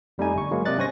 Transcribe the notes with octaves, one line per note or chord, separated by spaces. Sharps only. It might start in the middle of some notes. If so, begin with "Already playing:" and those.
F2 G3 A3 D#4 G#5
G1 C#6
F#3 G#3 A#3
C3 D5 D#5 F#6 A6
G2 C#4 C5 G#5 C#6 A#6